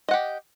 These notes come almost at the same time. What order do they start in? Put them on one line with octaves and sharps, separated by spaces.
D#5 F#5 G4